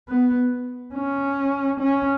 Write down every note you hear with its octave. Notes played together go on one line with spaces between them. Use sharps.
B3
C#4
C#4